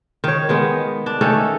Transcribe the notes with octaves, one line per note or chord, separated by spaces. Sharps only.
D#3 C#5
D#3 G#3 B3
D4
D#3 A3 C#4 A4